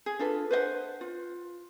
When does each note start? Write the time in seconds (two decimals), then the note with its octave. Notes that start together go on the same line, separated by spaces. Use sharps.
0.06 G#4
0.19 D4 F4 A4 B4
0.51 B4 C5 D#5 F#5
1.01 F4